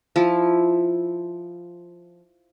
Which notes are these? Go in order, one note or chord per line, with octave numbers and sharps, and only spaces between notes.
F3 E4